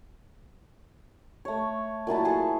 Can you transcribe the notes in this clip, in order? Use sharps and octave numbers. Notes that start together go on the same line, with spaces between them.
A3 C#5
A#2 F#3 E4 A5
G#4 A4